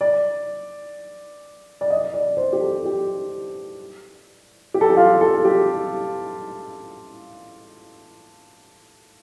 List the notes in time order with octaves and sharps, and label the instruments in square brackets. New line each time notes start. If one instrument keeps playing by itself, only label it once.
[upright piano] D5
D5
D#5
D5
C5
G4
A4
G4
G4
A4
G4
F4
A4
G4